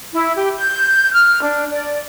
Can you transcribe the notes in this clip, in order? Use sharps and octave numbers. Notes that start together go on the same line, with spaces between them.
E4
G4
G6
F6
D4
D5